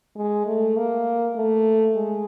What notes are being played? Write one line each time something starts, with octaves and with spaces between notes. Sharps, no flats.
G#3
A3
A#3
A3
G#3